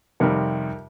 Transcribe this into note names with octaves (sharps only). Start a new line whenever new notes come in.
F2 C3 D#3 G3 A#4